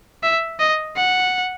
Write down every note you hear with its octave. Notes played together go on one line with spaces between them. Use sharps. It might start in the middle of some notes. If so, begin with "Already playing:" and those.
E5
D#5
F#5